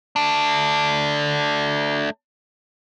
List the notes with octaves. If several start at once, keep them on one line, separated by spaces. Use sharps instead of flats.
A3 D4